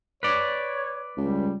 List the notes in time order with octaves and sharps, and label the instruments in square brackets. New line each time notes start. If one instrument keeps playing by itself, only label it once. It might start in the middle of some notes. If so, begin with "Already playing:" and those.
[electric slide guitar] B4 D5 [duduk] C#5
[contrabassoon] C#2 [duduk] G3